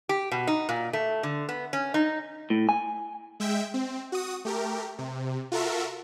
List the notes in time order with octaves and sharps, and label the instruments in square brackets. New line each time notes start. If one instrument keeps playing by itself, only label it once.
[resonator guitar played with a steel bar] G4
B2
D#4
A#2
A3
D3
B3
C#4
D#4
[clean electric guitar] A2
G#5
[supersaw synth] G#3 E5 G5
C4
F#4 D#6
A3 G4 A#4
C3
F4 F#4 A4 A#4 E5